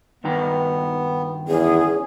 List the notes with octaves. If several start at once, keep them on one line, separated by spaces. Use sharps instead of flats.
G2 D#3 B3 A#5
E2 C#4 G#4